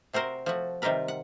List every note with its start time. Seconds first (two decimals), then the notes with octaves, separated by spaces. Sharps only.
0.13 C3 C4 F#4 A#4 C5
0.46 F3 A3 F#4
0.82 C3 D#3 G3 F4 A#4 B4
1.08 F#5